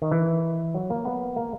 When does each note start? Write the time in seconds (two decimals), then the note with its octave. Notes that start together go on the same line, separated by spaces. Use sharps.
0.02 D#3
0.12 E3
0.74 F#3
0.90 A#3
1.05 B3
1.36 A#3